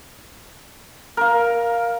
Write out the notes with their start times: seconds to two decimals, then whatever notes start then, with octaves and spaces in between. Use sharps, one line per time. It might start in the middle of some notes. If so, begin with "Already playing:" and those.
1.17 A#4 F5